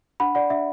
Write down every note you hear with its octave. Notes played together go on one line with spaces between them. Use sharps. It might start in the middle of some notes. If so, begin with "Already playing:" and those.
D4 F#5 B5
D5 F#5
D4 E5